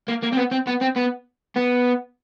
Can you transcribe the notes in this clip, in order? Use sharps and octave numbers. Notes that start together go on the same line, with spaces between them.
A#3
A#3
C4
B3
C4
B3
C4
B3
B3